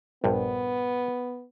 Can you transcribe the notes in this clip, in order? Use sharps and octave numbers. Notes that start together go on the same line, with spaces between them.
A#1 G2 B3